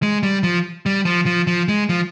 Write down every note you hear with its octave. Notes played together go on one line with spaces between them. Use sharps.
G#3
G3
F3
G3
F3
F3
F3
G#3
F3